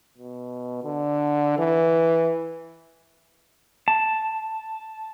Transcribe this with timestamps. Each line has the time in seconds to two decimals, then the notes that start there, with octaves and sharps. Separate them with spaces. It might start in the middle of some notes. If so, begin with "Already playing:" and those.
0.18 B2
0.84 D3
1.59 E3
3.88 A5